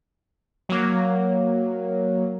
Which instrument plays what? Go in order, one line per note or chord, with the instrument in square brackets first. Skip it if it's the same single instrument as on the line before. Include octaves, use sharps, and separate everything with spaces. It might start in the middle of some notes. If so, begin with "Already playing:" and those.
[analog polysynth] F#3 A#3